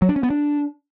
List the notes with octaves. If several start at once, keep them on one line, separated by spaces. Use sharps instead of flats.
F#3
D4
C#4
B3
D4